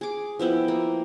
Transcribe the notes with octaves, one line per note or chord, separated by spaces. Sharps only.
G#4 D6
F3 B3 E4 G5
A#3